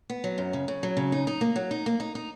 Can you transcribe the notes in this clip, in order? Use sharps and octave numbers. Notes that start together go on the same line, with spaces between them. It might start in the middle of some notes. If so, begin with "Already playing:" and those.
B3
F#3
F#2
C#3
C#3
F#3
C#3
D#4
D#4
A#3
F#3
D#4
A#3
D#4
D#4